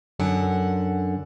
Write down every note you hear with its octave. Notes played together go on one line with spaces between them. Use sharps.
F#2 D3 F#5